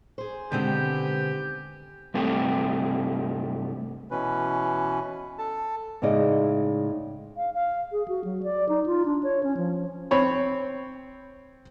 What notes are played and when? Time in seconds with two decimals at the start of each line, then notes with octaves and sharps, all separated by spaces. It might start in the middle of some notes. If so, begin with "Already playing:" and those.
0.18 G#4 C5
0.52 B2 D3 D#3 G#3 B3 C4 G4
2.14 G2 C3 A3 G4
4.11 B2 E3 C#4 B4
5.38 A4 A5
6.02 A2 C#3 G#3 D#4 D5 D#5
7.37 F5
7.54 F5
7.92 G#4
8.08 F#4
8.24 F#3
8.43 D5
8.69 D#4
8.86 F4
9.06 D4
9.23 C#5
9.43 C#4
9.57 F3
10.11 C4 C#5 B5